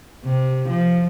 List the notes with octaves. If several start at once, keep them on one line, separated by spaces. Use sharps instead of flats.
C3
F3